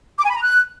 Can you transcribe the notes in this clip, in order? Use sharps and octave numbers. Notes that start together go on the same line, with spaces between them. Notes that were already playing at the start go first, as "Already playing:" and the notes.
D6
G#5
B5
A#5
F#6